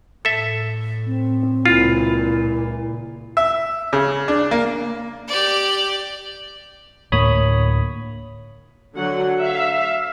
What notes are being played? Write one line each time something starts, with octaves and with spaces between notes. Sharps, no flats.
A2 A4 E5
C4
C#2 A#2 E4 F4
E5
C#3
D4
A#3
G4 D5
D2 A2 A#3 C#5 B5 D#6
D3 F#3 F#5
E5 F5